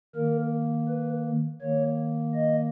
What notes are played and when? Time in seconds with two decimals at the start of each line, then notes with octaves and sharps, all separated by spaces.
0.15 D#3 A#3 A#4
0.88 B4
1.61 D#3 A#3 C#5
2.34 D#5